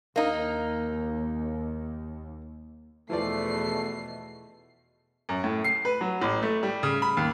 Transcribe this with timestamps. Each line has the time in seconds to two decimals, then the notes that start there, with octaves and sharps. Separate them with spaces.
0.16 D#2 A#3 D#4
3.10 E2 B2 E3 F3 A3 D5 C7
5.29 F#2
5.44 A2
5.64 C7
5.85 B4
6.01 F#3
6.22 A1
6.43 A3
6.63 G3
6.83 C#3
7.02 B5
7.17 D#2